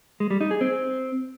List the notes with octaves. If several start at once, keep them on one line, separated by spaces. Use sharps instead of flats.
G#3
G3
D#4
G#4
C4